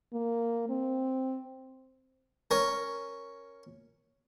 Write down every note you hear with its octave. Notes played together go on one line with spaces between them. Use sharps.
A#3
C4
C#4 A#4